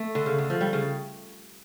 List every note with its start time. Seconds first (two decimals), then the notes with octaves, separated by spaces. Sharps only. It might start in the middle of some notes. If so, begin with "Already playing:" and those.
Already playing: A3
0.15 D3
0.26 C#3
0.38 D3
0.50 F3
0.61 G3
0.73 C#3